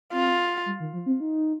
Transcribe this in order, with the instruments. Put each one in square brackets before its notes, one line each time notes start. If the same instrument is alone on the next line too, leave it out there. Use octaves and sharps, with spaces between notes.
[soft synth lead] C4 [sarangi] F4
[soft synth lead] G3
D#3
F3
C4
D#4